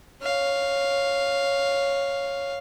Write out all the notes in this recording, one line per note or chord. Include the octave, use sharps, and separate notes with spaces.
C#5 F5